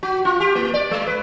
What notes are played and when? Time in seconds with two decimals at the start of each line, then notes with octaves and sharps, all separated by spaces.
0.03 F#4
0.25 F4
0.40 G4
0.55 A#3
0.74 D5
0.91 G#3
1.07 B4